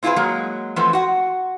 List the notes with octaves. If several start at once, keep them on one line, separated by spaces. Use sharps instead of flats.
C4 E4 F4 G4 G#4 B4
F#3 G#3 A#3
E3 F3 A3 B3 C4
F#4 F#5